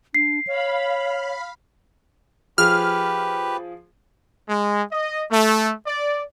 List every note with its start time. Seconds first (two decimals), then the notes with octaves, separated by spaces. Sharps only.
0.14 D4 C7
0.47 C#5 F5 B5
2.58 F3 G4 G#4 B4 F6
4.48 G#3
4.92 D#5
5.31 A3
5.87 D5